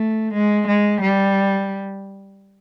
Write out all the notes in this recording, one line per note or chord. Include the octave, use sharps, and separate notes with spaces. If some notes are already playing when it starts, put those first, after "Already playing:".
Already playing: A3
G#3
G#3
G3